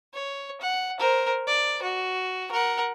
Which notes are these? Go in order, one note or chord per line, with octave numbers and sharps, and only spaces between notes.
C#5
F#5
A#4 C5
D5
F#4
A#4 F#5